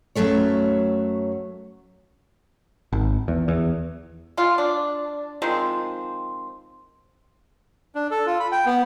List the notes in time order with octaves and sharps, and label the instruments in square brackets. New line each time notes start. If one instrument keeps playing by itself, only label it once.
[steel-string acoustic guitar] F#2 D#3 F#3 A3 C#5
[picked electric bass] G#1
E2
E2
[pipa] G#3 F4
D4
D#3 F3 G#3 C4
[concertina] D4
A4
F4
B5
G5
B3